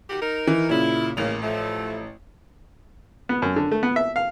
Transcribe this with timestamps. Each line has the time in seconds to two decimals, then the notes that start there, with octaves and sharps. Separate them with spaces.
0.09 D#3 F#4 G4
0.21 D#4 A#4
0.47 E3
0.69 A#2 C#3 E4
1.17 A1 C#3 A#3 F7
1.42 F3 A3
3.29 B3
3.42 F#2
3.56 D3
3.71 A3
3.83 B3
3.96 E5
4.16 F5